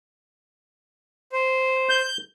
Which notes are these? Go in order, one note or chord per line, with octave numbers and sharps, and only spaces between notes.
C5
G6